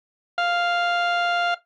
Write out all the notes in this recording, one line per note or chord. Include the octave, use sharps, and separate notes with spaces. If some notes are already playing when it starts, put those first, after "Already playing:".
F5